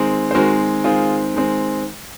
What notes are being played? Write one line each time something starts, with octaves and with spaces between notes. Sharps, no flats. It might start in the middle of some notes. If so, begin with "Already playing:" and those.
Already playing: D#3 G#3 C4
C5
D#3 G#3 C4 F#4 A#4
D#3 G#3 C4 F4 G#4
D#3 G#3 C4